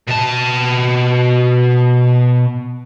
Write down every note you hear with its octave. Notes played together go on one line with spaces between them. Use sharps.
B2 A5